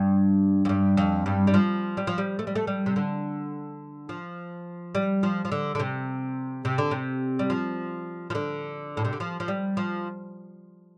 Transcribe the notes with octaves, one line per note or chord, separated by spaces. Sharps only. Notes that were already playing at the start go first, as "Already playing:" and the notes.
Already playing: G2
F2
G2
F2
G2
G3
F3
G3
F3
G3
A3
G3
A3
G3
C3
D3
F3
G3
F3
F3
D3
D3
C3
C3
D3
C3
G3
F3
F3
D3
A2
C3
D3
F3
F3
G3
F3